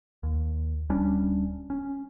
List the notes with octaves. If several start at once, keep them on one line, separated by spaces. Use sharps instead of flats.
D#2
D1 G3 C#4 D4
C#4